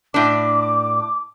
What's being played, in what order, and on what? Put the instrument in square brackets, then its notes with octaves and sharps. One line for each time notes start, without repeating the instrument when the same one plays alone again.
[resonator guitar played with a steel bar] A2 D4 [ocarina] D6